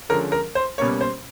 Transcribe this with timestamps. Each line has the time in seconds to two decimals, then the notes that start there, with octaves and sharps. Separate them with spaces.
0.09 D3 F3 G#3 C#4 A#4
0.32 A#4
0.55 C5
0.78 B2 G3 A#3 C#4 C#5
1.01 C5